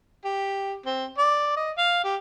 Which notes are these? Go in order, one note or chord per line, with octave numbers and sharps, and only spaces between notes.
G4
C4
D5
D#5
F5
G4